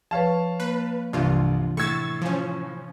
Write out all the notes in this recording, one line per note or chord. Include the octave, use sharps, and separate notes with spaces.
F3 B4 C#5 F5 A5
A#3 B4
C2 G2 C3 E3 D4 F4
A2 C#6 E6 G#6 A6
F3 C#4